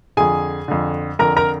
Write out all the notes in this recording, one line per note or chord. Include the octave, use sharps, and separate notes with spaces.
F2 D3 G#4 G#5
F2 D3
F2 D3 A#4 A#5
A#4 A#5